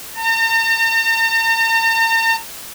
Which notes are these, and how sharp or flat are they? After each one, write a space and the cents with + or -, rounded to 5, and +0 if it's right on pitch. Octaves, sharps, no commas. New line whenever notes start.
A#5 -45